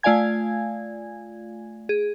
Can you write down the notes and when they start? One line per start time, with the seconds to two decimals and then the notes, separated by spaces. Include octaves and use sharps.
0.03 A3 F4 D5 F5 G#5 G#6
1.89 G#4